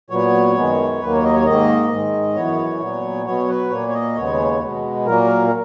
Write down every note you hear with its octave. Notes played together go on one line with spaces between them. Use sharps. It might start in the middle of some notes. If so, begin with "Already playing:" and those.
A#2 F#3 B3 C#5
F#2 D#3 G#3 B3
D#2 D#3 F#3 A#3 B4
C#5
D#5
C#5
G#2 D#3 A#3 D#5
G#2 D#3 G#3
F#2 E3 B3 C#5
A#2 F#3 B3
B2 F#3 B3 C#5
B4
A#2 A#3 C#5
C#5
D#5
D#2 C#3 G#3 B3 C#5
B2 G#3 B3
A#2 F#3 A#3 A#4
A#4